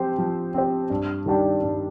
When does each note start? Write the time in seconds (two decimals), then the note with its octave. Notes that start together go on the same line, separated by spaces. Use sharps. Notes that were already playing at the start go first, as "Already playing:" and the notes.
Already playing: F3 C4 G4 C5
0.18 F3
0.54 C4 G4 C5
0.90 G2
1.26 D#3 G3 D4 G4
1.63 G2